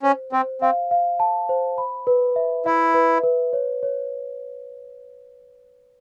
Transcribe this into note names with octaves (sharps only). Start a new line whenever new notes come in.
C#4 C5
C4 C5
C4 F5
F5
A5
C5
B5
B4
E5
E4 E5
B4
B4
C#5
C#5